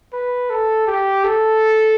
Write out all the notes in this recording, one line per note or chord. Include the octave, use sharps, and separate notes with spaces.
B4
A4
G4
A4